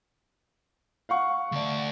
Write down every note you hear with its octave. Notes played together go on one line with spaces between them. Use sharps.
F5 F#5 C#6
D2 D5